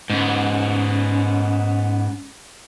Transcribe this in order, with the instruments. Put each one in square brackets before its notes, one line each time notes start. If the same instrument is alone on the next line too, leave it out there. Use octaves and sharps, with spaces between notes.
[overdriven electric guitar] G#2 B3 [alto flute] C#4